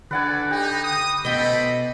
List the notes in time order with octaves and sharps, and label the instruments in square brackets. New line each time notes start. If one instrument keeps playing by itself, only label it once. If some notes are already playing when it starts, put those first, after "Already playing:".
[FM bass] D3 [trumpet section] F#4 A4 D5 [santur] B4 F#5 G#5
[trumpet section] D#4 [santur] G4
[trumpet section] D#6
[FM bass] B2 [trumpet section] C4 A4 B5 [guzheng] D#5 G5